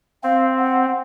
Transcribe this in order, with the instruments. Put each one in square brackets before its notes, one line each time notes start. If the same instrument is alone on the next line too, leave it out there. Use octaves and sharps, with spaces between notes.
[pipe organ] C4 [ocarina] F5
[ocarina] F#5